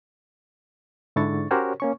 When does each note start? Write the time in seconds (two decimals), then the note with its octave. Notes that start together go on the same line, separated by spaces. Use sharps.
1.16 G#2 D3 D4 E4 C#6 A6
1.51 C#4 F#4 G4 A#4 C5 C#5
1.80 A#3 C#4 C#6